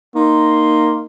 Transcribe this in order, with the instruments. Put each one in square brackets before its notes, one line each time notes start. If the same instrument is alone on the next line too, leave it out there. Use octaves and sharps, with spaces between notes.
[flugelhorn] A#3 [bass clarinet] D#4 [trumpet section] A#5 C6